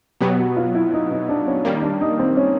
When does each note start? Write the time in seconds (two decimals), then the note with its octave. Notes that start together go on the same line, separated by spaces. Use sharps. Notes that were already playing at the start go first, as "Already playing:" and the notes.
0.21 B2 F#3 B3 G4
0.39 F#4
0.57 F4
0.74 E4
0.93 D#4
1.12 D#4
1.29 D4
1.47 C#4
1.65 D#3 G3 A#3 C#4
1.82 D4
2.01 D#4
2.19 C4
2.37 C#4